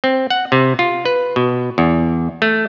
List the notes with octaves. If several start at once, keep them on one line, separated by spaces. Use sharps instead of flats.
C4
F#5
C3
F4
B4
B2
E2
A3